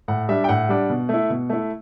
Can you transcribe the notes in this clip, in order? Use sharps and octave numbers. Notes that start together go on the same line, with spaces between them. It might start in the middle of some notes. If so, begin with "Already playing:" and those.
A2 F#5
G3 D4 E5
G5
A2 F#5
G3 D4
B2
A3 E4
B2
A3 E4